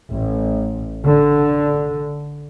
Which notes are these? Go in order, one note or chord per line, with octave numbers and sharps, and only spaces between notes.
A1
D3